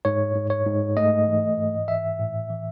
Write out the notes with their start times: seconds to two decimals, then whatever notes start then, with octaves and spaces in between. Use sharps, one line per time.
0.05 G#2 C#5
0.35 G#2
0.50 C#5
0.66 G#2
0.97 A3 D#5
1.28 E3
1.58 G#2
1.88 E3 E5
2.19 A2
2.50 E3